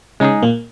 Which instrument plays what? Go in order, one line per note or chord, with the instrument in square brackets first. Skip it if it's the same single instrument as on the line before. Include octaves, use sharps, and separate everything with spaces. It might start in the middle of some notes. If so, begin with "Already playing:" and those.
[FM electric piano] C#3 C#4 [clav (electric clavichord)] G#3 D#4 G#4
[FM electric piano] A#2 A#3